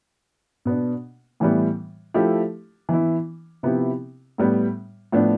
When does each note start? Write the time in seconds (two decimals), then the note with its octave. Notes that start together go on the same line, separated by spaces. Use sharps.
0.65 B2 B3 D4
1.40 A2 E3 G3 B3
2.14 F3 A3 E4 G4
2.89 E3 B3 E4
3.63 C3 F3 B3 E4 G4
4.38 A2 G3 B3
5.12 A2 F3 B3 D4